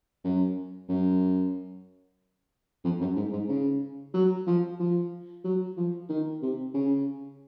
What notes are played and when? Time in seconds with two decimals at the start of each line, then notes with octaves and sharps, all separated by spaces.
0.24 F#2
0.89 F#2
2.84 F2
3.01 F#2
3.16 G#2
3.32 G#2
3.49 C#3
4.14 F#3
4.47 F3
4.79 F3
5.44 F#3
5.77 F3
6.09 D#3
6.42 C3
6.74 C#3